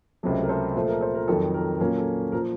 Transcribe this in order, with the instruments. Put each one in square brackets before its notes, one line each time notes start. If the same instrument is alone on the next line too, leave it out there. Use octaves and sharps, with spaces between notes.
[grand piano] C#2 C3 F#3 A3
A#4
A4 C5
A#2 F3 A3 C4 A4
A#4
A4 C5
A#4
F2 D#3 F#3 A4
A#4
A#2 F#3 A#3 C#4 A#4
A4
A#2 F3 A#4